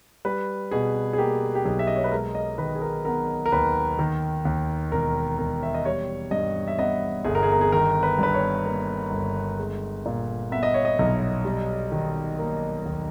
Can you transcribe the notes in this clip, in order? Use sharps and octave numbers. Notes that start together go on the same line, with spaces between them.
G3 B4
B2 G#4
G#4
A#3 G4
G4
B1 G#4
E5
D#5
C#5
B4
G#3 A#4
D#5
D#3 B4
G#4
A#4
B3 A#4
A#4
D#2 B4
D#3
D#2
E1 A#4
E1 A#4
E5
D#5
G3 C#5
G2 D#5
E5
B3 D#5
G1 G#4
A#4
G#4
A#4
G#4
D#3 A#4
B4
G2 B4
C#5
A#3
G1
G#3
A#2
B3 E5
D#5
C#5
D#5
B1
G3
D#3
A#3
D#2